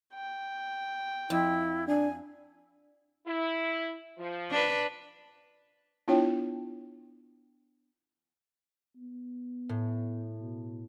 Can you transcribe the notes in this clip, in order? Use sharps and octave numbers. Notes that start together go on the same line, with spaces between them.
G5
F2 E4
D4 G#5
E4
F3
D4 B4
B3 D4 E4 F4 C#5 G5
B3
A2
B2